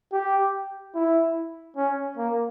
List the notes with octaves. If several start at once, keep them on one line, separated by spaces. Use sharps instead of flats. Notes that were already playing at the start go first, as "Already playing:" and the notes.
G4
E4
C#4
A#3